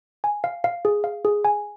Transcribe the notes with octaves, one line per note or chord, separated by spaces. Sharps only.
G#5
F5
F5
G#4
F5
G#4
G#5